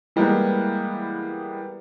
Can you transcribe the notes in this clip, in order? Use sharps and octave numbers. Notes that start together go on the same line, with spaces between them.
E3 G3 G#3 A#3 B3